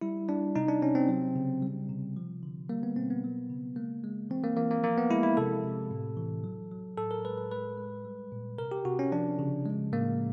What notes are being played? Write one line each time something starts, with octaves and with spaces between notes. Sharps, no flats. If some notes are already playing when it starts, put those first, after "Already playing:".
G3 E4
G3 D4
C3 D#4
D4
C3 C#4
C4
F#3
C#3
G3
C3
F3
D3
G3 A#3
B3
B2 C4
B3
F#3
C#3
G#3 A#3
G#3
E3 C4
A#3
E3 A#3
A#3
F3 A#3
B3
G#3 E4
E4
C3 A4
C3
A2
E3
F#3
F#3
A2 A4
A#4
G#3 B4
B4
G#3 B4
G#3
G3
A#2
C3 A#4
G4
C3 F#4
C#4
F3 D4
C#3
G#3
A2 A#3